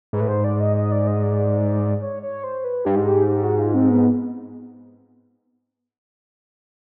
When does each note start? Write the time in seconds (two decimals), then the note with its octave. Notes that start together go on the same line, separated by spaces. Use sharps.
0.13 G#2 B4
0.20 A2
0.27 G#2 C5
0.44 D5
0.60 D#5
0.76 D#5
0.92 D5
1.07 D#5
1.23 D5
2.01 C#5
2.23 C#5
2.44 C5
2.64 B4
2.85 G2 G4
2.95 G#2
3.06 G4
3.27 G4
3.43 F#4
3.59 F4
3.74 C4
3.90 B3